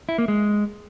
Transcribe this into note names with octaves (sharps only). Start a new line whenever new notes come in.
E4
A#3
G#3